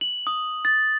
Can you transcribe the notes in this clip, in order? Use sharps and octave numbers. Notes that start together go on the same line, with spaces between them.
F#7
D#6
A6